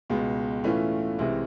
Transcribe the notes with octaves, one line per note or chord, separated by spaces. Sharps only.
C#2 B2 G#3
A2 E3 A3 C#4 F4
C2 C3 E3 G#3